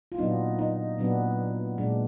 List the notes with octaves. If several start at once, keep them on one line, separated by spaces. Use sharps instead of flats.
F4
A#2 F#3 B3 D4 D#4
D#4
A#2 F#3 B3 D4
A#2 G#3 D4